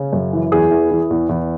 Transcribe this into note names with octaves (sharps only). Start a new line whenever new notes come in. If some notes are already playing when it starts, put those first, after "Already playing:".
Already playing: C#3
F#2
E3
E2 G#4
E3
E3
E2
E2